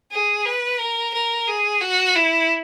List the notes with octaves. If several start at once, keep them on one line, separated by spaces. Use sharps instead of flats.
G#4
B4
A#4
A#4
G#4
F#4
E4